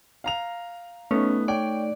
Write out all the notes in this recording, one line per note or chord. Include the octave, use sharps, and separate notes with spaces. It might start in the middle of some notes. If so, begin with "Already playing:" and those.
F5 A#5 F7
A3 B3 C#4 D#4
C#5 D5 G5